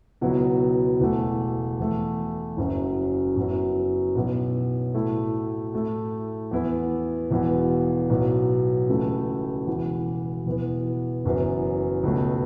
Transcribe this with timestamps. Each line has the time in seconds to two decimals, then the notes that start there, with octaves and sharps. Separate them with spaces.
0.21 C#2 B2 F#3 B3 E4
1.00 E1 E2 E3 A3
1.79 E2 E3 A3
2.57 F#1 F#2 C#3 F#3
3.36 F#2 F#3 B3 E4
4.15 B1 B2 B3 E4
4.94 A2 A3 E4
5.73 A2 A3 E4
6.51 E2 E3 B3 E4
7.30 E1 E2 B2 B3 E4
8.10 B1 A2 F#3 B3
8.88 C#2 C#3 E3 A3
9.67 E1 E2 E3
10.46 E1 E2 E3 B3
11.25 F#1 F#2 E3 B3
12.03 C#2 B2 A3 C#4